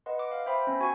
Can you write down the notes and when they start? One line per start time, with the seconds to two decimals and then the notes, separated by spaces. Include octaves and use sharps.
0.06 B4 D#5 F#5 C6
0.19 D6
0.31 F5
0.46 C5 E5 G5 B5 C6 D#6
0.67 B3 C#4
0.80 F#4 F#5 G#5 C#6 G#6